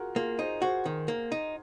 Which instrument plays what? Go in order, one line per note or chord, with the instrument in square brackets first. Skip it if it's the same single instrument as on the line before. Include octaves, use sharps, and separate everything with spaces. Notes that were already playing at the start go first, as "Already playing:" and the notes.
Already playing: [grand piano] F4 F#4 G#4 A#4
[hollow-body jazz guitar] A#3 [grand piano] F4 G#4
[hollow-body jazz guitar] D#4 [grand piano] G#4 C5
[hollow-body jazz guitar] F#4 [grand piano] G#4 C5
[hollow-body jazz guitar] D#3
A#3
D#4